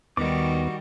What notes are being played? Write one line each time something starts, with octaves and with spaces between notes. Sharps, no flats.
D#2 D#3 G3 B3 F#4 D6